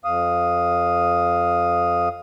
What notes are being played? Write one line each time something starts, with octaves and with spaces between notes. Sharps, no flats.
F2 F5 D#6